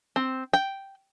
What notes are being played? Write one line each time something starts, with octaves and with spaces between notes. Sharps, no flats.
C4
G5